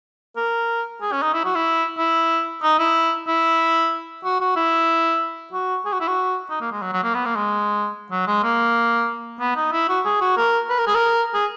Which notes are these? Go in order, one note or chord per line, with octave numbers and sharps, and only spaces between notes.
A#4
G#4
C#4
D#4
E4
F#4
E4
E4
D#4
E4
E4
F#4
F#4
E4
F#4
G#4
F#4
E4
F#4
D#4
A#3
G#3
F#3
F#3
A#3
B3
A#3
G#3
F#3
G#3
A#3
B3
D#4
E4
F#4
G#4
F#4
A#4
B4
A#4
G#4
A#4
G#4